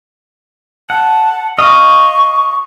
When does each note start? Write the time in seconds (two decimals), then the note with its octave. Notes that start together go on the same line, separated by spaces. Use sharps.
0.90 F#5 A5
1.58 D#5 F5 C#6